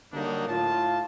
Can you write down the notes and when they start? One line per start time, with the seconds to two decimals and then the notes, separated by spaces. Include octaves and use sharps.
0.13 D3 F#3 G3 A#3 D4 D#4
0.48 A2 F4 A5